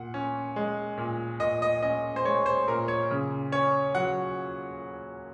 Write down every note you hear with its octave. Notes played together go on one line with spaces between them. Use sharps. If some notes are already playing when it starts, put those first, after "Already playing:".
Already playing: A#2 F#5
C#4
G#3
A#2
A#2 D#5
D#5
C#4 D#5
C5
G#3 C#5
C5
A#2 A#4
C#5
C#3
C#4 C#5
F#3 F#5